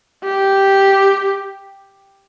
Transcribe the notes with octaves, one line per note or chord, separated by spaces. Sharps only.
G4